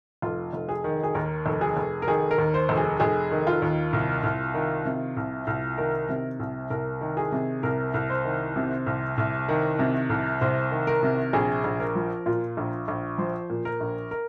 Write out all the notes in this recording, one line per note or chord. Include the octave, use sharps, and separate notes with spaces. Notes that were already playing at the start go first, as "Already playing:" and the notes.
F1 F4
F1
G#4
D#3
G#4
D#2 A#4
F1
G#4
F1
A#4
D#3 G#4
A#4
D#2
C5
F1
G#4
F1 G#4
D#3
F4
D#2
C2
C2
D#3
C3
C2
C2
D#3 A#4
C3
C2
C2 A#4
D#3
G#4
C3
C2 A#4
C2
C5
D#3
C3
C2
C2
D#3
C3
C2
C2 C5
D#3
A#4
C3
A#1 G#4
A#1
A#4
F3
A#2 F4
A#1
A#1
F3 C5
A#2
A#4
A#1
A#4